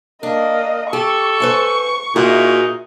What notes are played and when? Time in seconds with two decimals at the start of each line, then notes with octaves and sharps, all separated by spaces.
0.23 A#3 D4 D#5
0.93 G4 A4 C#6
1.40 B4 C5 G#5
2.16 A#2 D#4 E4 F#4 G#4